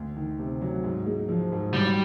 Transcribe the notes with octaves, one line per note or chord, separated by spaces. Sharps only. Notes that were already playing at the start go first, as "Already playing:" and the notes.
Already playing: D2
D#3
C3
F#3
G#2
G#3
F3
G#2
F#3 G3